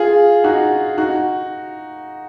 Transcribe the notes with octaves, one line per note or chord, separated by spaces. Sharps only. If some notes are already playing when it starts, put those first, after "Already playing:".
Already playing: F4 G#4
D#4 F#4
D#4 F#4